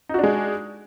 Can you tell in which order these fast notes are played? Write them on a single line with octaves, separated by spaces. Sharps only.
D#4 F#4 D4 G#3